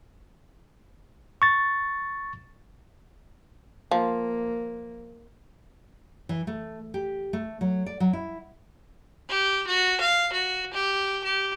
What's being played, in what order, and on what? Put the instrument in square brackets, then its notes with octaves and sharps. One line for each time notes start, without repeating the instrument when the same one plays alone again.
[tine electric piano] C#6 A6
[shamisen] F3 [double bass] A#3
[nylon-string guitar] E3
A3
G4
A3
F#3
D5
F#3
E4
[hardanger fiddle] G4
F#4
F5
F#4
G4
G4